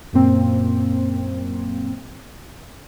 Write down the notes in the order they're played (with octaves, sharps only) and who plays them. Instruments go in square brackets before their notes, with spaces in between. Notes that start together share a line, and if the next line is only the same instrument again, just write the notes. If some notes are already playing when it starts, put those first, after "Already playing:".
[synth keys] F#2 A#2 A#3 C4